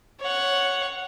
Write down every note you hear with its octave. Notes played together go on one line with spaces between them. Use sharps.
C#5 F#5